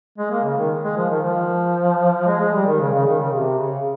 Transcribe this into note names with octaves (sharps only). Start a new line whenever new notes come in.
G#3
A#3
C#3
D#3
G#3
F3
D#3
F3
G#3
G#3
G3
D#3
C#3
C#3
D#3
C#3
C3
C#3